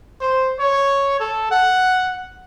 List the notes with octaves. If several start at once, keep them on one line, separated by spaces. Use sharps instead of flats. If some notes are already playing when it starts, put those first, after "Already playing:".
C5
C#5
A4
F#5